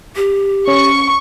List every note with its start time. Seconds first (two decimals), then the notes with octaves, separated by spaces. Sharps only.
0.16 G4
0.68 C#4 C#6